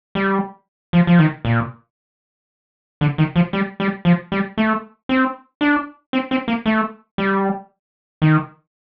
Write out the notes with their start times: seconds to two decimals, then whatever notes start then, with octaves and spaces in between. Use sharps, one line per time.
0.15 G3
0.93 F3
1.07 F3
1.19 D#3
1.45 A#2
3.01 D3
3.18 D#3
3.36 F3
3.53 G3
3.80 G3
4.05 F3
4.32 G3
4.58 A3
5.09 C4
5.61 D4
6.13 C4
6.31 C4
6.48 A#3
6.66 A3
7.18 G3
8.22 D#3